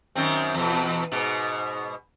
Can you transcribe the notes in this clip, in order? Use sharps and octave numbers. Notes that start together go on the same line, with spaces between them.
F#2 D#3 C4
E2 B2
G#2 B2